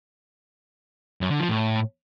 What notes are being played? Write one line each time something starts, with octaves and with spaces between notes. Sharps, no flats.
F#2
D3
F3
A2